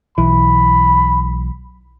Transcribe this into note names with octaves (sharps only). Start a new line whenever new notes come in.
B1 E3 B5